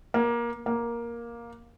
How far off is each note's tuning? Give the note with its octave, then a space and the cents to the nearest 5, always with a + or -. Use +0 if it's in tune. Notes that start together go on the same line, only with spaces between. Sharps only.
A#3 +20
A#3 +10